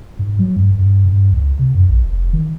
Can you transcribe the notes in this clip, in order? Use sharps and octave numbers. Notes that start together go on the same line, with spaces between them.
G#2
F#3
G2
G2
G2
C#2
C3
F#2
A#1
F1
D#3